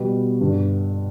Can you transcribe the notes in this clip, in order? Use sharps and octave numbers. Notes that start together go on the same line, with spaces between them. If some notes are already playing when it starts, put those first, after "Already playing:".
Already playing: B2 G3 B3
G1 G2 D3